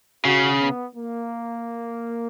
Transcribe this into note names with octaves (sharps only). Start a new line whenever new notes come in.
C#3 F#4
B3
A#3